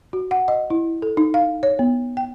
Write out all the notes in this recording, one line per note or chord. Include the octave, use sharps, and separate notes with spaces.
F#4
F#5
D#5
E4
A4
D#4
F5
C#5
B3
G5